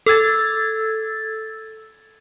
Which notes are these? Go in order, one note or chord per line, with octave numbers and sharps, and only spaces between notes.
A4 E6 G#6 A6